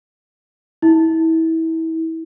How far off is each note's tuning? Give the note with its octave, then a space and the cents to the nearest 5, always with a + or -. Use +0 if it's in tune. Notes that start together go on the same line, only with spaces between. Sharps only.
E4 -30